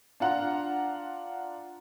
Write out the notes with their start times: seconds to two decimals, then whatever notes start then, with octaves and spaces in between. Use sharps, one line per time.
0.20 D4 F4 F#5 A#5